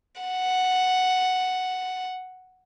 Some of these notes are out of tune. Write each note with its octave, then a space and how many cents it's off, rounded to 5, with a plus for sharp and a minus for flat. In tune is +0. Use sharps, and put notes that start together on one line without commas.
F#5 +0